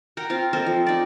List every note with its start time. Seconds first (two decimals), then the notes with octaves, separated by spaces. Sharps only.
0.17 A#4 F#5 G5 A#5
0.30 C4 F4 F5
0.53 C4 A4 A#4 D#5
0.66 F3
0.87 D#4 D5